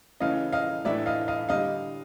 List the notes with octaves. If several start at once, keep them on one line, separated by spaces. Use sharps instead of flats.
C#3 E3 A3 C#4 D#5 F5
D#5 F5
A2 E3 A3 D4 D5 E5
D#5 F5
D#5 F5
D3 G3 D#5 F5